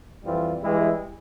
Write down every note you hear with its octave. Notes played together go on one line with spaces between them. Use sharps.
F2 E3 G3 C4 F4
G2 E3 G#3 E4 G4